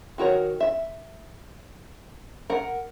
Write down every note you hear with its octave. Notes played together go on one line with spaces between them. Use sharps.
D#3 F#4 A#4 C#5
E5
A#4 F#5